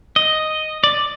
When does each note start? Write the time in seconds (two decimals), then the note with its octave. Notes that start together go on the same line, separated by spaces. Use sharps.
0.16 D#5
0.84 D5